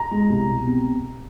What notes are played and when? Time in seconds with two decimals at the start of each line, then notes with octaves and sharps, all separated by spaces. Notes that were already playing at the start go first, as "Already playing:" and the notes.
Already playing: A#5
0.11 G#3
0.30 C2
0.48 B2
0.67 C4